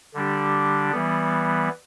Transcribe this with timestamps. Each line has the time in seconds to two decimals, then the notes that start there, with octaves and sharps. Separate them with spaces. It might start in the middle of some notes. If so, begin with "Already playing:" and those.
0.14 D3 G3 D4 G4
0.92 E3 G3 B3